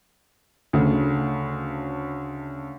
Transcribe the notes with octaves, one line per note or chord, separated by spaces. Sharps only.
D2 C#3 A3